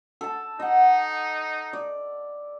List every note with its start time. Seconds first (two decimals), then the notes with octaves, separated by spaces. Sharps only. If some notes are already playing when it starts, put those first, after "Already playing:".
0.21 A4 A5
0.60 D#4 D#5 F#5
1.73 D5